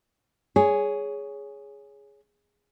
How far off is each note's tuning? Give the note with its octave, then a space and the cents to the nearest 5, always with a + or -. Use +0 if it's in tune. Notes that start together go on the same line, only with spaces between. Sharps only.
G#4 +0 C#5 +15